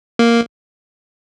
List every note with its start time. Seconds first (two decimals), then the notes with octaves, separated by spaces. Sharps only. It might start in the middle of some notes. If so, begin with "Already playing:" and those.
0.19 A#3